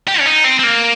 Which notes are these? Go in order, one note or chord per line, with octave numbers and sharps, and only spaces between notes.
G4
C#4
D#4
C4
C4
A#3